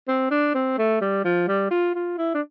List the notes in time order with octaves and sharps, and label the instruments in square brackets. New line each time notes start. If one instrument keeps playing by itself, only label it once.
[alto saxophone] C4
D4
C4
A3
G3
F3
G3
F4
F4
E4
D4